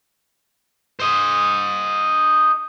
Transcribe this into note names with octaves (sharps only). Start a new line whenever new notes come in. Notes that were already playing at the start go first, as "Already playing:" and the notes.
C5 D#5